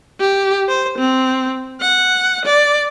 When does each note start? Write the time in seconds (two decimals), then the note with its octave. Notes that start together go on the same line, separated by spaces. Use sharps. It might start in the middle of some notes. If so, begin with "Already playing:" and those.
0.20 G4
0.68 C5
0.98 C4
1.81 F#5
2.45 D5